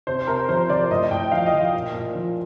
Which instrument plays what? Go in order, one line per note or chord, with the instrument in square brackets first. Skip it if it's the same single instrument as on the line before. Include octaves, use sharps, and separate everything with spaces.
[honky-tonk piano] C3 C5
C3 A#4
F3 C5
F3 D5
A2 D#5
A2 G5
F3 F5
D#5
F3
A#2
A#2
F3